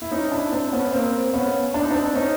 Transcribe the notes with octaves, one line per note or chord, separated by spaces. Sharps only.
E4
C#4 D#4
D4 E4
C4 D4
B3 C#4
A#3 C4
B3 C#4
D4
D#4
C4 D4
C#4 D#4